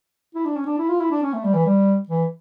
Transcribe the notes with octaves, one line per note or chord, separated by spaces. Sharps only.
E4
D4
C#4
D4
E4
F4
E4
D4
C#4
A3
G3
E3
G3
E3